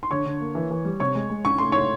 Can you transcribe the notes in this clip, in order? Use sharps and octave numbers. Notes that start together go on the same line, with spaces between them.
C6
D3 C#5 C#6
D3
A#3
E3
E3
G3
C3 C#5 C#6
G#3
G#3
C#4 C#6
A3 C6
A3 C#5 C#6